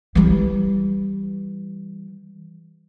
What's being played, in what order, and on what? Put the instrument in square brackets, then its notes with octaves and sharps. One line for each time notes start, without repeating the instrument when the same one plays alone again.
[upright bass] E3 G3